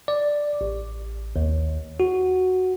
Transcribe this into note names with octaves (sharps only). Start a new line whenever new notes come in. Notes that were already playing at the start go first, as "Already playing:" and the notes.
D5
A1
D#2
F#4